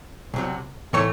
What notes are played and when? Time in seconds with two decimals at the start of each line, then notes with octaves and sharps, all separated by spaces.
0.34 C2 C3 F#3
0.93 A2 E3 A3 C#5